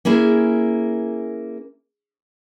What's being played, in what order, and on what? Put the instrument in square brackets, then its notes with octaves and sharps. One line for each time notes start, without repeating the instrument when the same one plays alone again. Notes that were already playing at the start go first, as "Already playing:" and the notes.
[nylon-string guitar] A#3 C#4 E4 G#4